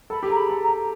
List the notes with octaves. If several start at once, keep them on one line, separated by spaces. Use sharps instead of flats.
A4 B5
G4
G#4 A#5
B5
A4
A#5
A4